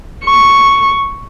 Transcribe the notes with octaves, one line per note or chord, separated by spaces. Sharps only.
C#6